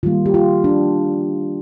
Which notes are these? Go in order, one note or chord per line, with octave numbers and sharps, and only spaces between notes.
D#3 G3 A#3 F4
G4
F4
D4